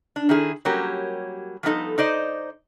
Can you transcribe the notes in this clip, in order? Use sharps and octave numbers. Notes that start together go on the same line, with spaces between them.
D4
D#3 E4 G#4
F#3 G3 A#3 C#4 G4 A#4
F3 G3 B3 D#4 A4
D#4 C5 D5 D#5